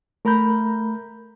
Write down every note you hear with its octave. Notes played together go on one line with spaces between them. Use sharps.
A3 A#4 A#5 B5 G6